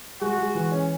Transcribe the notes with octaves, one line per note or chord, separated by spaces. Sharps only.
G#3 F#4
G#3
E3
C#4